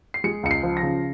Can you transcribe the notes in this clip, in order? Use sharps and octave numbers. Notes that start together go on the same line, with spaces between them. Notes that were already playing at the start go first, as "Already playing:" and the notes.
C7
G#3 C#7
C#2 C#7
C7
F3
A#6
C#3